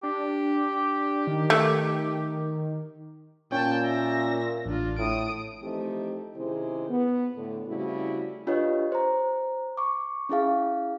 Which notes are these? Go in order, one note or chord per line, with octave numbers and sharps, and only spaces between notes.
D4 G4
D#3
A3
A#2 C#4 C#5 G5 A5
E5 A#6
A1 D4 F4
A2 D#6 D7
E3 F3 A3 C4 D#4 G4
C3 D#3 C#4 E4 G#4 C5
B3
A2 D3
C#3 G3 A3 C4 E4 F#4
D4 F4 G4 B4 C#5 D#5
C5 A#5
C#6 D6
C#4 E4 G#4 F5